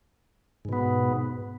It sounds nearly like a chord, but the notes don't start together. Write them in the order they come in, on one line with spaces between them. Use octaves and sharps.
G#2 B2 B3